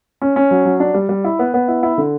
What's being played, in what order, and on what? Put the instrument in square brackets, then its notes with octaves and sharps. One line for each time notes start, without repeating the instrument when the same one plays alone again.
[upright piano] C#4
C#4
F#3
F#3
D4
G3
G3
E4
B3
B3
E4
E4
D3